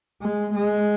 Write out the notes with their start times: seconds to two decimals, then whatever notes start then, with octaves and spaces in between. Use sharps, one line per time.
0.22 G#3
0.55 G#3